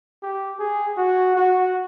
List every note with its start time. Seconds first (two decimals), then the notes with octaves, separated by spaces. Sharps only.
0.23 G4
0.59 G#4
0.97 F#4
1.36 F#4